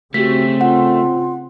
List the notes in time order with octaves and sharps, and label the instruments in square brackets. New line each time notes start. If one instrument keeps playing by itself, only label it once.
[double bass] C#3 C4 [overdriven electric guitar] A3 [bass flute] F#4 [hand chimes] G4 B6
[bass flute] F4 [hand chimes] F#5